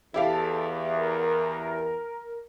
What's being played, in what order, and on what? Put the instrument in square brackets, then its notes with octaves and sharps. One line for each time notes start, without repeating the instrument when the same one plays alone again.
[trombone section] E2 [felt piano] E4 G4 F5 [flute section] A4
[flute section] A#4